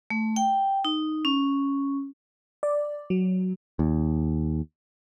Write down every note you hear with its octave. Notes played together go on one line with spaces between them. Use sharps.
A3
G5
D#4
C#4
D5
F#3
D#2